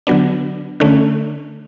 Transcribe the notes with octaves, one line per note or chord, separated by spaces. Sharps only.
D3 F#3 B3 D4
D3 A3 C#4